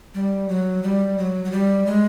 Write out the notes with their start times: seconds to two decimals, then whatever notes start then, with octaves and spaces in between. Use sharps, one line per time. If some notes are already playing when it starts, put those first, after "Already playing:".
0.14 G3
0.49 F#3
0.83 G3
1.18 F#3
1.45 F#3
1.52 G3
1.86 G#3